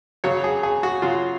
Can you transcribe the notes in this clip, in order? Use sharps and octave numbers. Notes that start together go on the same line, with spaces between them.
C#3 F#3 C#5
G#4
G#4
F#4
C#3 F#3 F4